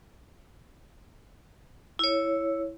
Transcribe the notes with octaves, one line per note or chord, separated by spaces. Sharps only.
E4 C#5